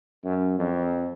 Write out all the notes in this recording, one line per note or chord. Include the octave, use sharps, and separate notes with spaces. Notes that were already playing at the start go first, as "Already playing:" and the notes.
F#2
F2